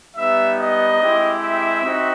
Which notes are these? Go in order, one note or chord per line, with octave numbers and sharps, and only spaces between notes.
G3 B3 D#4 E5
D#5
G#3 C4 E4 G4
E5
C4 D#4 F#4